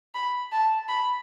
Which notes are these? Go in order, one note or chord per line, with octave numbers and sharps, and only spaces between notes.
B5
A5
B5